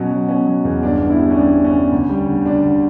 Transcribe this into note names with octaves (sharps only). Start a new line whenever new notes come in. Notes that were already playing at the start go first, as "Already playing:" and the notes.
Already playing: B2 F#3 C#4
F#3
B2 C#4
F#3
E2
G1 D4
D3
E4
G3
C#4
G3 D4
G1
C#4
D3
D2
G3
D3
D3 D4
D3